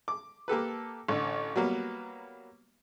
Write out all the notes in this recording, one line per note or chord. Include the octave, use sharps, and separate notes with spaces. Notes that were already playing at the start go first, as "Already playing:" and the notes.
D6
A#3 G4 A4 B4
A1 D3
F#3 G3 A#3 B3